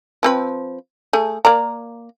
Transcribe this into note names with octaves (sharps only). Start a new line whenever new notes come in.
F3 C4 B4
A3 G#4
A#3 D5 A#5